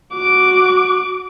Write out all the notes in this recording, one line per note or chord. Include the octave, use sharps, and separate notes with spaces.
F#4 D6